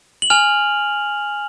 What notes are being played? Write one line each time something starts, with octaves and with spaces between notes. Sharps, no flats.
F#7
G#5 F6 F7